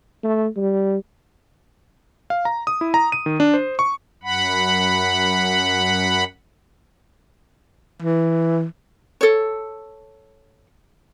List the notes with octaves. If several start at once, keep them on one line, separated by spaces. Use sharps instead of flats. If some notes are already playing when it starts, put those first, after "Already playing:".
A3
G3
F5
A#5
D#6
E4
A#5
D#7
D#3
D4
C5
C#6
F#2 F#5 B5
E3
A4 C#5